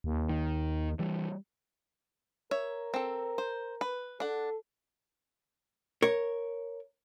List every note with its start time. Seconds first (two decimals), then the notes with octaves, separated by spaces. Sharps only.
0.04 D#2
0.29 D#3
0.99 E3 G3
2.51 A#4 C#5 E5
2.94 C4 A4
3.38 C5
3.81 B4
4.20 D4 A4 F#5
6.02 A#4 C#5